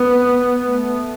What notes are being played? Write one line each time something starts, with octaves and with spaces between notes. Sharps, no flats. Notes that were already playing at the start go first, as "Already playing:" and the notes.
Already playing: B3
A3